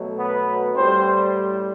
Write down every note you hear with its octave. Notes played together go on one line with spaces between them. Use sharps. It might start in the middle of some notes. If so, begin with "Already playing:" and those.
Already playing: B2 F#3 A3
B3 B4
A2 G3 C4 C5